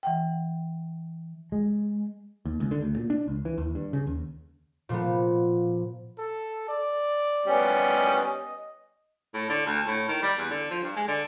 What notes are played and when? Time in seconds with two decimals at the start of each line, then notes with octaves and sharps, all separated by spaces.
0.03 E3 F#5 G5
1.52 G#3
2.45 D#2
2.60 C#2
2.71 D3
2.82 D2
2.96 A#2
3.10 D4
3.27 C#2
3.45 E3
3.58 D#2
3.75 G2
3.93 C#3
4.07 D#2
4.89 A#2 F3 B3
6.18 A4
6.68 D5
7.46 G3 B3 C#4
7.77 D#5
9.34 A2
9.49 D3
9.66 D2
9.87 A2
10.08 D#3
10.23 G3
10.38 E2
10.50 D3
10.71 F3
10.83 G2
10.96 G#3
11.08 D3